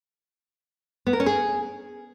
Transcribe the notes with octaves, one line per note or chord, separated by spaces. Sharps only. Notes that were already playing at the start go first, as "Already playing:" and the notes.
B3
A#4
C#4
G#4